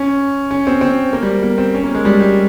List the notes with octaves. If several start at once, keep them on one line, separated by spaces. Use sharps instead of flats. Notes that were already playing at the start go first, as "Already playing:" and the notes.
Already playing: C#4
C#4
C4
C4
A#3
G3
A#3
C4
C#4
A#3
G#3
G3
G3